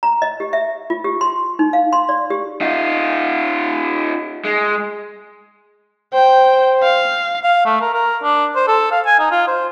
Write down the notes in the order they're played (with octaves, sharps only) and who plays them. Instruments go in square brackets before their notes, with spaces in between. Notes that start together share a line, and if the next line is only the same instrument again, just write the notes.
[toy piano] A#5
D#5
G4
E5
F4
G4
C6
D#4
F5
C6
D5
G4
[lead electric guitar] D#4 F4
G#3
[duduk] C5 [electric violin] G5
[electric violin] F5
[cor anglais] F5
A3
A#4
A#4
D4
C5
A4
F5
G#5
D#4
F4
C5